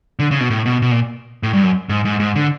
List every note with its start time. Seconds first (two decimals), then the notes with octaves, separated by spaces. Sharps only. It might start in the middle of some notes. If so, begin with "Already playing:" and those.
0.19 D3
0.31 C#3
0.40 B2
0.50 A2
0.66 B2
0.82 B2
0.91 A#2
1.43 A2
1.53 G2
1.63 F#2
1.89 G#2
2.05 G#2
2.20 G#2
2.35 D3